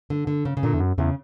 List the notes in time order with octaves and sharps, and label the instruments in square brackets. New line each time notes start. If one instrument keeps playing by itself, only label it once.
[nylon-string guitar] D3
D3
C#3
C#3
[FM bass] A#2 [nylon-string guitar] D3
[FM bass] E2
F#2
[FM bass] E2 [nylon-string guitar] C#3